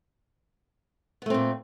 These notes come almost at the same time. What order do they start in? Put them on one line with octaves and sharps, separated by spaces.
B3 A3 C4 A#2